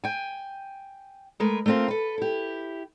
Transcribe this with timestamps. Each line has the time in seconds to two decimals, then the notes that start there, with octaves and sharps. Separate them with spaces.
0.04 G5 G#5
1.40 G#3 A3 A#4 B4
1.66 A3 A#3 C4 F4 A#4
1.88 A4 B4
2.18 E4 G4